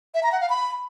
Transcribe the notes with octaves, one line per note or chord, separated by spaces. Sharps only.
E5
A#5
F#5
F5
B5